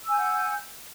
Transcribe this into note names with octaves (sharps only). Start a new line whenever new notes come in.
F#5 G#5 E6 G6